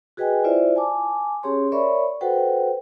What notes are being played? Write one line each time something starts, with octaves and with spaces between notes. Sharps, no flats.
F#4 G#4 B4 D#5 G5 G#5
E4 F4 C5 D5 E5
G#5 A5 D6
C#4 G4 G#4 C#5 C6
A#4 C#5 D5 E5 B5 C#6
F#4 A4 B4 C5 F#5 G5